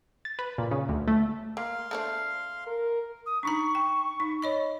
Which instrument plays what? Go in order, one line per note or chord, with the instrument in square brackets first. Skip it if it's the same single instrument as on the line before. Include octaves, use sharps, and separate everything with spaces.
[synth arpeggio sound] A6
B4
A#2
C#3
D2
A3
[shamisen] A#3 [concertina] F5 C6
[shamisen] A3 D4 C5
[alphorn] A#4
[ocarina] D#6
[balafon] D4 D#4 A#5 [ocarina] C#6
[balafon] G5
D#4
C#5 D#5 B5